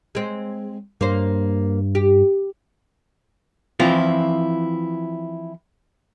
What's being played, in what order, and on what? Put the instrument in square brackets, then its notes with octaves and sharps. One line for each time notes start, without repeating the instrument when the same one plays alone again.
[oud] G#3 C4
[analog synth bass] G2 [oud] A#3 C5
[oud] G4
[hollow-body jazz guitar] E3 F3 C4 E4 F4